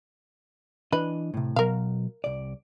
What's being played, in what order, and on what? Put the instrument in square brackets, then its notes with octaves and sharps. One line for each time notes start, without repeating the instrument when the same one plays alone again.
[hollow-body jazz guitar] E3 D4 D#5 [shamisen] B4
[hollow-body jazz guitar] A2 C3
[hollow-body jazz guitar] B2 F#3 [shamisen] A#4 F5
[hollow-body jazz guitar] C2 D5